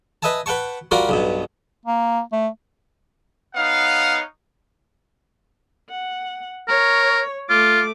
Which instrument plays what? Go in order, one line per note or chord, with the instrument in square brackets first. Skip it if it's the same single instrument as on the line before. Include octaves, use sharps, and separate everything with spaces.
[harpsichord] B4 D#5 E5 G#5 A5
B4 F#5 G5 A5 C#6
G3 F4 F#4 A#4 D5
B1 G2 B2
[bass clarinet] A#3
A3
[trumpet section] B3 D#4 C#5 F5 F#5
[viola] F#5
[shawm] A#4 [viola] C#5
[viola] A3 D6 [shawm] F4